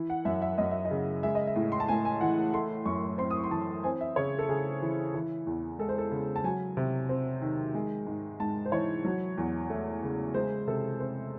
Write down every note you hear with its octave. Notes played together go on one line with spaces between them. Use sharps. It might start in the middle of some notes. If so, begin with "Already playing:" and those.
Already playing: E3
F#5
F#2 E5
E5
F#2 D#5
E5
D#5
C#3
G#3 E5
D#5
E5
A2
C6
A5
A2 G#5
G#5
E3 F#5
A3 C6
F#2 C#6
C4 C6
D#6
C#6
C6
E3 A5
C4 G#5
E5
C#3 C#5
A4
C#3 G#4
E3
E3
E2
G#3 A4
C5
A4
C#3
A5
F#3 G#5
C3
C4
D#3
G#3
G#2
G#2 A5
C5
E3 C#5
F#3
E2
A3
C#3
G#3 C5
C3 A4
C4 C5